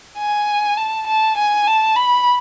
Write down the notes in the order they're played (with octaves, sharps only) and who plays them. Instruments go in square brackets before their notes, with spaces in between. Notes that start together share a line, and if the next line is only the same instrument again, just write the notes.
[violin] G#5
A5
A5
G#5
A5
B5